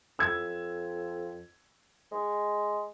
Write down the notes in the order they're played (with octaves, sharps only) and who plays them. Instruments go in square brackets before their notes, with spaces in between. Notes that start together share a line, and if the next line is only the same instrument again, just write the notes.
[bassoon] F2 [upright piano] E6 G#6
[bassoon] G#3